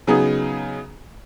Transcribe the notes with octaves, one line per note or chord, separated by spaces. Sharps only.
C#3 F#3 B3 D#4 G#4